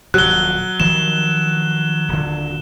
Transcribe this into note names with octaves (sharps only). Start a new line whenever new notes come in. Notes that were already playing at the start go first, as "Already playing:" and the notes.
D#1 F2 F#3 F#6 G7
D#3 F3 G3 E7
D#1 D3